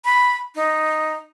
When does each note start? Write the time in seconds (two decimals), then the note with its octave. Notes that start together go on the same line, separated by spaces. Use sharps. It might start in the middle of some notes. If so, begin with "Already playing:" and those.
0.05 B5
0.55 D#4